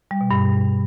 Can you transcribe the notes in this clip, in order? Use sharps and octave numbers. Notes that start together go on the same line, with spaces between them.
G3
B2
G2